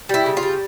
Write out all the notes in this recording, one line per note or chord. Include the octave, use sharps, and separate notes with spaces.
G3 E4
C#3
F4
G3